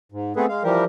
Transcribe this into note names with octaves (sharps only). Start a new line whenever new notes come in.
G#2
A3 B3 C4 G#4 A4 B4
G#3 F5
E3 F3 G3 G4 A#4